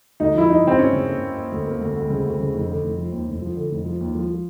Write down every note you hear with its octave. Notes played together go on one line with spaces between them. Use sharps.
D2 D#4
F3 E4
F3 D#4
C#3 C4
A#3 C#4
C#3
A#3
A#3
A#3
D2
A#3
D2
D2
C#3
D2
C#3
F1
D3
F1
F3
D#2
F1
F3
D3
F1
F3
D#2
F3
F3